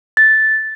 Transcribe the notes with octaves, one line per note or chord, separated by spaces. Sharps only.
A6